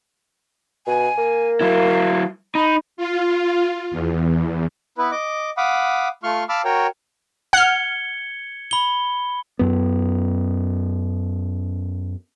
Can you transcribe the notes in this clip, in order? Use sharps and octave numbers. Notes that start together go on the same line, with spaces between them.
B2 G#5
A#3
F#3 E4 F5
D#4 B5
F4
E2
B3 E4 B4
D#5 D6
F5 F#5 B5 D6 D#6
A3 F4 C6 C#6 F6
F5 A5 B5 D6 E6 F6
F#4 A#4 C#5 G5
F#5 F6 G#6 C#7 G7
B5 G7
F#2 B3